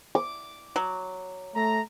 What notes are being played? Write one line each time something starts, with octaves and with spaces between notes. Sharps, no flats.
D6
F#3
A3 A#5